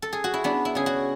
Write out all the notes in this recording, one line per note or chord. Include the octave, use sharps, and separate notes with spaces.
A4
G#4
F#4
E4
B3 D4
E4
C#3 G#4
F#4